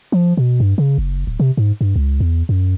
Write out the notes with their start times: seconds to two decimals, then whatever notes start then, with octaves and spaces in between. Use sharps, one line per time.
0.12 F3
0.37 B2
0.60 G2
0.78 C#3
0.98 F#1
1.27 D1
1.40 C3
1.57 G#2
1.81 G2
1.96 C#2
2.20 E2
2.49 F#2